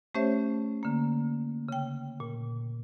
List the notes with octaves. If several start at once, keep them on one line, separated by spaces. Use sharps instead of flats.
A3 C#4 G4 C5 C#5 E5
D3 A#3
C#3 G5
A#2